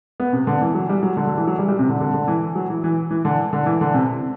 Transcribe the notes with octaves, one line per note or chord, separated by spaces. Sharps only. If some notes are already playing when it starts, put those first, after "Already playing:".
B3
C3
D3
E3
F#3
G3
F#3
D3
D3
E3
F#3
G3
G3
C3
D3
D3
D3
E3
F#3
E3
E3
E3
D3
D3
E3
D3
C3